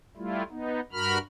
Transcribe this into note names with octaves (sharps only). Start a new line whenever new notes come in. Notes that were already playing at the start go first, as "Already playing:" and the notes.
G3 A3 E4 F4
B3 D#4
G2 F#4 A#4 B5 F6